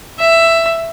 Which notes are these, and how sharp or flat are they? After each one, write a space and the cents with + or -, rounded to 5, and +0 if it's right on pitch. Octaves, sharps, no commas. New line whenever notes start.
E5 +10